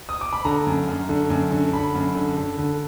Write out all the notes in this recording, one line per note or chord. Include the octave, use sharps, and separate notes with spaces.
D#6
D6
B5
D3 A#5
F#2
F#2
D3
F#2
D3
D3 B5
F#2
D3
D3
D3